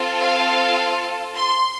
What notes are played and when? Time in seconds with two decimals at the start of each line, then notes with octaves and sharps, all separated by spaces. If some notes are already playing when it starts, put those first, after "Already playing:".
Already playing: C4 F4 A4
0.20 F5
1.37 C6